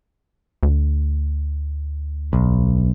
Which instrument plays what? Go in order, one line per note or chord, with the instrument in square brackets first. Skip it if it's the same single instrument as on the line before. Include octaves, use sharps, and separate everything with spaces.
[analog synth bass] D2
[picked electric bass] B1